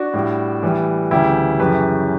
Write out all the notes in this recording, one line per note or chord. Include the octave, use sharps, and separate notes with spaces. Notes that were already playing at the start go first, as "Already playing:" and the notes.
Already playing: D4 F#4
A2 G3
A2 E3 G3
D2 C#3 E3 G3 E4 G4
F#2 C#3 E3 G4 B4